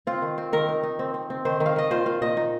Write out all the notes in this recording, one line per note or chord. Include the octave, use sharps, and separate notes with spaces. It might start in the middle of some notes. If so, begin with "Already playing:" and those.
C4 F4
D#3
C4
D#3 A#4
D#4
D#4
C4
C4
C4
D#3 C5
D#3
F5
D#3 D#5
A#2 C5
A#2 F5
A#2 D#5
D#4